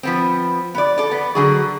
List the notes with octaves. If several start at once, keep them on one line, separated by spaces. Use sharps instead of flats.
F3 B3 C4
B3 D5
A4 D5
B3
D3 F#3 G#4